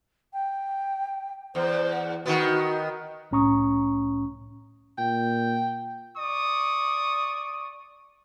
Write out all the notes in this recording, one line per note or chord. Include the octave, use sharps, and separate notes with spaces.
G5
E2 C5
F#5
D#3 B3 F#4
C2 A2 C#4 A#5 C#6 D#6
A#2 G5
D5 C#6 D#6